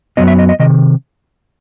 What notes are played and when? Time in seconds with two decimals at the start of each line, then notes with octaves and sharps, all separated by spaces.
0.17 F#2 C#3 F#3 B3 D#5
0.28 E5
0.39 D#5
0.49 D#5
0.60 C3 D#3 D#5